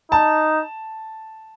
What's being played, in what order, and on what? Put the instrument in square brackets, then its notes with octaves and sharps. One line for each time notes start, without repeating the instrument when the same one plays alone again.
[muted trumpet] D#4 [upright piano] A5